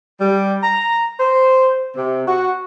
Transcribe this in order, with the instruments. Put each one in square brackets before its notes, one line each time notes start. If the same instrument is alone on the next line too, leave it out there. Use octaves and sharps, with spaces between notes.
[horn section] G3
A#5
C5
C3
F#4